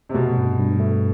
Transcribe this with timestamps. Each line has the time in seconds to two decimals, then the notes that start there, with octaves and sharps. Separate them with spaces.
0.09 C3
0.14 B2 A3
0.36 G2
0.59 G2
0.80 A3